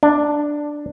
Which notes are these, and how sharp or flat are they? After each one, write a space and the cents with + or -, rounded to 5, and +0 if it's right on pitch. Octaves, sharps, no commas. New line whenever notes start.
D4 +5